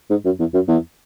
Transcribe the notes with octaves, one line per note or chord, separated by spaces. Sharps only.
G#2
F#2
E2
F#2
E2